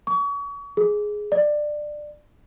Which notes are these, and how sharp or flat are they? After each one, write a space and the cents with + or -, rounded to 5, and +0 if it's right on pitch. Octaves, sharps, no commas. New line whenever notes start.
C#6 +35
G#4 +5
D5 +20